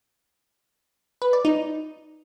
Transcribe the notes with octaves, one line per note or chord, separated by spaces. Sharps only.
B4
D5
D#4